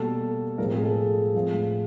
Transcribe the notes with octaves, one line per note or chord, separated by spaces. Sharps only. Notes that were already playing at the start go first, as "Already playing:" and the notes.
Already playing: B2 G3 A#3 A4
A2 F3 G#3 C4 A#4
G#4
A4
A2 F3 G#3 C4